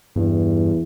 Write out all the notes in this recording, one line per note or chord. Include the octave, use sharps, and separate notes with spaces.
E2 G2